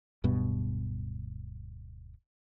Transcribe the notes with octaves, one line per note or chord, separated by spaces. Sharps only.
D1 G2 B2